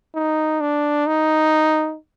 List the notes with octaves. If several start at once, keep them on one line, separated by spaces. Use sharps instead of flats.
D#4
D4
D#4